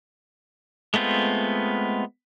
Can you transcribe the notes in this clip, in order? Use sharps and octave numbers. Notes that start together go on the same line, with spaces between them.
G#3 A3 B3 C4 F4